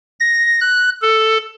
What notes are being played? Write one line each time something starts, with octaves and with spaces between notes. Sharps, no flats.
A#6
F#6
A4